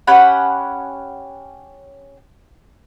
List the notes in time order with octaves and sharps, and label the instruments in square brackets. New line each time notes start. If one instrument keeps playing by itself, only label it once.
[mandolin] C#4 G4 F#5 B5